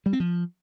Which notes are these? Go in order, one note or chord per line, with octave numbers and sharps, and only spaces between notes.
G3
C4
F3